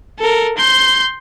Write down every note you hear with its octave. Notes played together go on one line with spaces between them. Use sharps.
A4 A#4
C6 G6